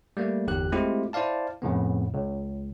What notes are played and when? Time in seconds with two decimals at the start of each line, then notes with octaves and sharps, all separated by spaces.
0.17 G3 A3 A#3
0.47 G1 E2 G4 F#6
0.72 G#3 A3 C4 E4 F4 G4
1.13 E4 C5 D5 F5 A5
1.62 F2 A2 C#3 B3
2.14 C#2